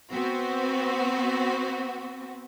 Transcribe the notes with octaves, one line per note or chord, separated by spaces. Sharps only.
B3 C4 F#4